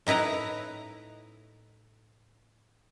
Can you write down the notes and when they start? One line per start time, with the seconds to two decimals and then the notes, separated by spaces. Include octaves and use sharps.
0.07 A2 D#4 E4 B4 A#5